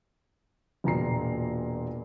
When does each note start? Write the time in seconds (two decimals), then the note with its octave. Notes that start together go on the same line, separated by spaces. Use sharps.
0.84 E1 A#2 A#5 C7